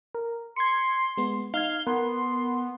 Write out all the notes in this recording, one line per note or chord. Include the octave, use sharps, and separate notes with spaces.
A#4
C6 G#6 C#7
G#3 B3
D#4 F5 F6 G#6 G7
B3 A#4 C6